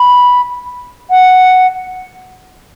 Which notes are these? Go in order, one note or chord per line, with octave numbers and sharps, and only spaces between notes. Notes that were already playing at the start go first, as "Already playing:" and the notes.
Already playing: B5
F#5